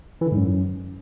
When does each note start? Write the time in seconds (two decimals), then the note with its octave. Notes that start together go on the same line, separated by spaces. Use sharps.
0.21 E3
0.26 D3
0.32 G#2
0.37 F#2